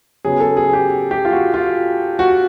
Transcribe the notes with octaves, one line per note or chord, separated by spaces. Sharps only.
C#3 F#3 B3 G#4
A4
G#4
G4
G4
F4
F#4
F4
F#4